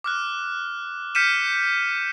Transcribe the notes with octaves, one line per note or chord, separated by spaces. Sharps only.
D6 F6 F#6
F6 G6 B6 C#7 D#7 E7